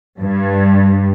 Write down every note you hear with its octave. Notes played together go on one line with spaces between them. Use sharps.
G2